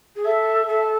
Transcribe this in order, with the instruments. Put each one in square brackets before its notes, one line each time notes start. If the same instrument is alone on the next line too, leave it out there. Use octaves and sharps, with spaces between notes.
[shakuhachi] G#4
[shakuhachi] A4 [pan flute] E5
[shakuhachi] A4